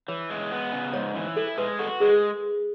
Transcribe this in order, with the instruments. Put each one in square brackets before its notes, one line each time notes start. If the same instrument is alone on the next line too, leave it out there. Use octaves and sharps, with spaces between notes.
[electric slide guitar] E3 [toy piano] C#5
[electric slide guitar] G#3
B3
C#3
[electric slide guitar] G#2 [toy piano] C#5
[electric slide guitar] E3
[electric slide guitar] E4 [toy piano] A4
[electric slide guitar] G#3 [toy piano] B4
[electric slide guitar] F#4 [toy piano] A4
[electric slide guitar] G#3 [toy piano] G#4